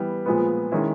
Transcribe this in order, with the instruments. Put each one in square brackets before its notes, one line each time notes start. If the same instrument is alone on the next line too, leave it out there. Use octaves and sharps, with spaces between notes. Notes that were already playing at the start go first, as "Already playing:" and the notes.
Already playing: [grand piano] E3 G3 B3
A#2 F3 G#3 B3
D#3 G#3 C#4 E4